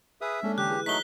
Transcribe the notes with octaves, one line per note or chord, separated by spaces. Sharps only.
G#4 B4 E5 D#6 F6
G#3 A#3 C#4 D4 A4
D3 E3 G4 F#6
E4 G#4 B4
F#3 A3 D#4 F#6 B6 G7